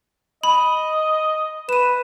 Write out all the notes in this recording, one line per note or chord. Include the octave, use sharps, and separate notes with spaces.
D#5 B5
B4 D#7 E7